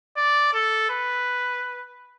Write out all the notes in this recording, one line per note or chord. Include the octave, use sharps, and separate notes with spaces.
D5
A4
B4